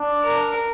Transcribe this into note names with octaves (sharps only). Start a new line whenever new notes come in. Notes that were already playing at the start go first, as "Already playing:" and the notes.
Already playing: D4
A#4